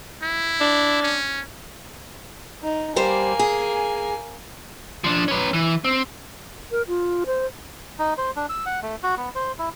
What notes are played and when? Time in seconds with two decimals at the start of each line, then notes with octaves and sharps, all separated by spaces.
0.22 E4
0.61 D4
1.02 C#4
2.63 D#4
2.96 G3 A#3 G4 C5 G#5
3.39 G#4
5.04 F3 D4
5.28 C#4 B4
5.53 E3
5.85 C4
6.71 A#4
6.88 F4
7.26 C5
7.99 D#4
8.18 C5
8.36 D4
8.49 E6
8.66 F#5
8.83 A3
9.03 F#4
9.18 B3
9.35 C5
9.59 E4